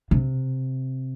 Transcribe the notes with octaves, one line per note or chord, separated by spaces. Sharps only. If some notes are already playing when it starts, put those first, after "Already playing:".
C3